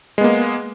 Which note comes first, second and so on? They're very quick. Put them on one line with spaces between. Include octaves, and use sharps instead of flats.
G#3 B3 A#3